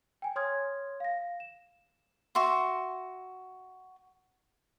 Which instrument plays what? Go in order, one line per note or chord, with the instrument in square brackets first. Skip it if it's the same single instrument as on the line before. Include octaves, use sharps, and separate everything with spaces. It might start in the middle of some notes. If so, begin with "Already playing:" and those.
[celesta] G5 G#5
C#5 C6 D#6 F6 G#6
F5 A#6
E7
[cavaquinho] F#4 E5 C6